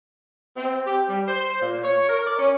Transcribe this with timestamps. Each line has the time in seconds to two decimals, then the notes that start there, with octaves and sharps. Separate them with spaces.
0.57 C4
0.86 G4
1.09 G3
1.28 C5
1.62 A#2
1.84 C#5
2.09 A#4
2.26 D5
2.39 C#4